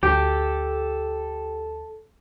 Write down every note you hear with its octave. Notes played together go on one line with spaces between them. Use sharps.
D2 G4 A4